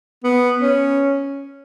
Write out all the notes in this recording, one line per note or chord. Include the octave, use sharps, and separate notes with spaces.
B3
C#4